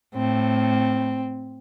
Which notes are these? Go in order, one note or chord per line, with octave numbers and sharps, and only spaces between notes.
A2 C4